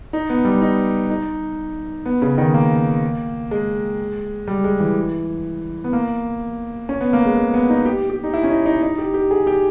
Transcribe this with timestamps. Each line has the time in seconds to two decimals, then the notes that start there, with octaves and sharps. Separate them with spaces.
0.13 D#4
0.29 B3
0.45 G3
0.61 D#4
1.10 D#4
2.06 B3
2.22 C#3
2.38 D#3
2.54 A#3
3.51 G#3
4.47 G3
4.64 G#3
4.80 E3
5.84 B3
5.93 A#3
6.89 C#4
7.01 B3
7.13 A#3
7.26 G#3
7.37 G#3
7.54 B3
7.70 D#4
7.86 G4
8.10 G4
8.24 D#4
8.34 E4
8.43 C#4
8.50 D#4
8.66 D#4
8.82 D#4
8.98 G4
9.14 G4
9.31 G#4
9.47 G4